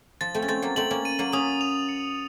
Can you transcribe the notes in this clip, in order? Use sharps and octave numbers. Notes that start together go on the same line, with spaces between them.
F3 A6
A3 C4
C#4
A3 C4 A6
F#3 A#3
A3 C4 F#7
A#3 C#4
D#7
F#3 A#3
A#3 C#4 D#6
F7
C#7